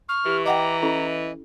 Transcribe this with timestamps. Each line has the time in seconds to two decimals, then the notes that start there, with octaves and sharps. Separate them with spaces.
0.09 C#6 F6
0.26 E3 G4
0.46 D#5 F#5 G5 A#5 D6
0.82 C#4 E4 A4 D#5